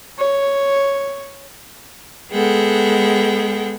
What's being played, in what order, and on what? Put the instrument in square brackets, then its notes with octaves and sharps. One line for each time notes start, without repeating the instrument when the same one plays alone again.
[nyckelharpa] C#5
[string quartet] G#3 B3 G#4 A4 F#5 G5